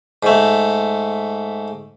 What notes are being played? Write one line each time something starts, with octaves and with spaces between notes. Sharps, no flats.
G#2 A3